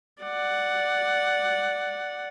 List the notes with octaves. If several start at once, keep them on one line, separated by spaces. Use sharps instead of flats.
D5 F#5